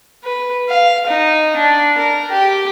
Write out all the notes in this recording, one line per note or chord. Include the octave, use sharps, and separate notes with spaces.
B4
F5
D#4
D4
A#4
G4